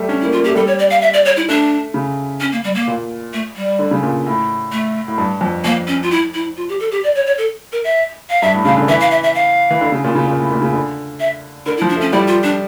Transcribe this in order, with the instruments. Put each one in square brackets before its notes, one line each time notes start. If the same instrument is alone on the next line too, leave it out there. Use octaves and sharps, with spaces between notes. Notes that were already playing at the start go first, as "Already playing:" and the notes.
Already playing: [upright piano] G3 A3
[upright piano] C#4 [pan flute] D4
[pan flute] E4
[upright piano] A#3
[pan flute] F4
[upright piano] A#3
[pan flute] G4
[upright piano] A3
[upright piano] G3 [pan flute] A4
[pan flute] C#5
D5
F5
E5
D5
C#5
E4
[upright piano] A3 [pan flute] D4
[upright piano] C#3
[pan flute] C#4
A#3
G3
A#3
[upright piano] A#2
[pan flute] A3
G3
[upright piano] D3
C#3
A#2
A2
[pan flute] A3
[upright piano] A2
G2
F2
[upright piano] F2 [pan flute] A#3
[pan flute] C#4
F4
E4
E4
F4
G4
A4
G4
D5
C#5
C#5
A4
A#4
E5
F5
[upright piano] G2 [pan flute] E5
[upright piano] A2
[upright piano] C#3 [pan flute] F5
[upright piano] D3
[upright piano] E3 [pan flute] E5
[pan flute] F5
E5
E5
F5
[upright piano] E3
D3
C#3
A#2
C#3
A#2
A2
A#2
C#3
D3
[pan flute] E5
[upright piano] D3 [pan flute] A#4
[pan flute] E4
[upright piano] F3
[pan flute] D4
[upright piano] A3
[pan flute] C#4
[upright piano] G3 [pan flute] E4
[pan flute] F4
D4